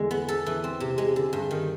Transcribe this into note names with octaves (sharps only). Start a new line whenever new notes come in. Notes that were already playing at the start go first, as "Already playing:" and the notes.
Already playing: E2 D3 G#3
B3
A4
E3
C4
C3
G#3
D3
G2
D#3